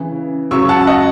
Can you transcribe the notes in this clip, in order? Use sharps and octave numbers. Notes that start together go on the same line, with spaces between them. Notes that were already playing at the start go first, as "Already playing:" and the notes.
Already playing: C#3 E3
C#3 F#3 C#6 E6
F#5 A5
D#5 F#5